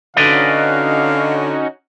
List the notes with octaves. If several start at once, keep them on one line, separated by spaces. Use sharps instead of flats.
D3 C#4 D#4 F#4 B4 D5 D#5 F5